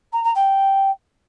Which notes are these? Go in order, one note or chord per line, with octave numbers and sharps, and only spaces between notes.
A#5
A#5
G5